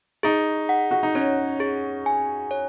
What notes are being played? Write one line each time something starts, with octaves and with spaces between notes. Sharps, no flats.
D#4 G#4
F#5
F#4
D#4
C#4 C#5
G#4
G#5
C#5